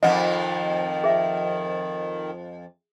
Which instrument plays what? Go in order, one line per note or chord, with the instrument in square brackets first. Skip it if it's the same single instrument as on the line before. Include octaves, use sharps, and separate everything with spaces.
[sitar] F2 G#2 F3 [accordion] D#3 [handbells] D#5 F#5
[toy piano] G#4 E5